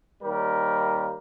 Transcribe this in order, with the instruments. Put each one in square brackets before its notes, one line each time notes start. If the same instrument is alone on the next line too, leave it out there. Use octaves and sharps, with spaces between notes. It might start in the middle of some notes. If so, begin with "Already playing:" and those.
[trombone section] D#2 G3 A#4